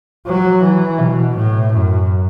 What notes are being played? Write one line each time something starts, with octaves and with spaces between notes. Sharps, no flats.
F#3
E3
B2
A2
F#2